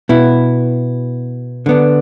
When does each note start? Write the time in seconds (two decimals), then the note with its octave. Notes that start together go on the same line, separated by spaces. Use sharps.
0.09 B2 B3 E4
1.66 D3 B3 D4